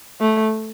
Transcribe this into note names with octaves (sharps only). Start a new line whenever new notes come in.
A3